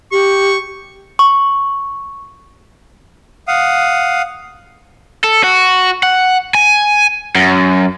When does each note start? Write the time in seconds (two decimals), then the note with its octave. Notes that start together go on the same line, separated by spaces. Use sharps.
0.12 G4 C#6
1.19 C#6
3.48 F5 F#5 D#6
5.24 A4
5.44 F#4
6.03 F#5
6.55 G#5
7.35 F#2